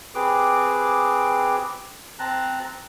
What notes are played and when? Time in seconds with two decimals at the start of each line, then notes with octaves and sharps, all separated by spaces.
0.15 C4 G4 G#4 B4 D6
2.19 C4 A5 A#5 F#6